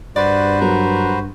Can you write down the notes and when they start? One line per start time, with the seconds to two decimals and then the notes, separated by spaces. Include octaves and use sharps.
0.16 G2 F#4 B4 C5 D5
0.62 F#3 A#4